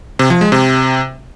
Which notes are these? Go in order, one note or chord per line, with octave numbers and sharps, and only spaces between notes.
C3
F3
G#3
C3